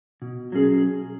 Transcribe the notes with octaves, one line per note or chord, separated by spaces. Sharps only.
B2
F#3 C#4 G#4